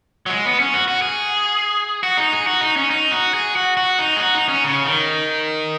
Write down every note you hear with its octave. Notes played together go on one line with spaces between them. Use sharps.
F#3
G#3
B3
C#4
F#4
F#4
G#4
F#4
D#4
G#4
F#4
D#4
C#4
D#4
F#4
G#4
F#4
F#4
D#4
G#4
F#4
D#4
C#4
C#3
D#3